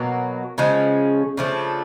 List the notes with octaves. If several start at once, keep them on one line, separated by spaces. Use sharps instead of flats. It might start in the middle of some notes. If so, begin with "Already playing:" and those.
Already playing: B2 F#3 A#3
C#3 F3 G#3 C#4
C#3 F3 A3 D4